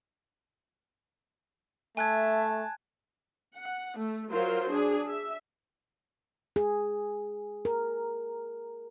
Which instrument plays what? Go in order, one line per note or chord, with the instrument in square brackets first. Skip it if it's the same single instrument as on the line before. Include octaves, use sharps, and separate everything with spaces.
[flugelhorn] A3 [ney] E5 [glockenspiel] G#5 F#6 G#6 [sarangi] A5
[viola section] F#5
A3
F#3 F4 A#4 C5
D4 G#4
E5
[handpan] G#4
A#4